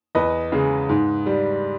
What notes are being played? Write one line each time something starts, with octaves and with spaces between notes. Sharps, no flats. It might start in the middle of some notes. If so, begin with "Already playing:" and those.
E2 B4 D#5
C#3 G#3
G#2
G3